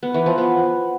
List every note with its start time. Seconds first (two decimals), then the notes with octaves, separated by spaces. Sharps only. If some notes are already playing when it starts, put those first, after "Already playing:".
0.03 B3
0.14 E3
0.26 F3
0.38 B3